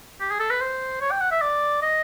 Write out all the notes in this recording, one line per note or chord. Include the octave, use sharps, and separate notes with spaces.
G4
G#4
A4
B4
C5
C#5
G5
F#5
E5
D5
D#5